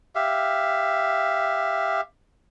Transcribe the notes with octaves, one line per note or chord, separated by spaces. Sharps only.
G4 E5 F5